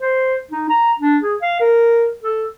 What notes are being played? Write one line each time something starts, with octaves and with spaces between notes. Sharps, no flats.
C5
D#4
A#5
D4
G#4
F5
A#4
A4